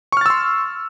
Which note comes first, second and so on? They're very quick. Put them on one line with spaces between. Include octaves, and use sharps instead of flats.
C#6 F6 A6 E6 C6